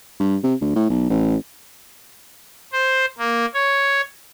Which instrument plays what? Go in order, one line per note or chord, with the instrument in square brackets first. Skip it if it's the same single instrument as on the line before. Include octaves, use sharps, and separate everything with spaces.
[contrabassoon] G2
C3
D2
A2
B1
A1
[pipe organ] C5
A#3
C#5